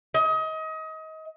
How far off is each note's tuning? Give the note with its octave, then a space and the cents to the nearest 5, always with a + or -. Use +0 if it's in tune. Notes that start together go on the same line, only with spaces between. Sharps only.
D#5 +30